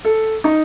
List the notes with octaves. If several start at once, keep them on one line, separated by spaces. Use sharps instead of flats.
A4
D#4